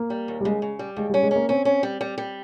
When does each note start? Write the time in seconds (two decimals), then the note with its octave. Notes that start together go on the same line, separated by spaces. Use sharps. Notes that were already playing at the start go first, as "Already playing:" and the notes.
Already playing: A#3
0.10 G3
0.28 D#2
0.41 G3
0.45 C#3 G#3
0.62 C#3
0.79 G3
0.97 D#2 G#3
1.10 G3 C#4
1.23 G#3
1.31 A#3 C#4
1.49 C4 C#4
1.65 C#4
1.83 G3
2.01 G3
2.18 G3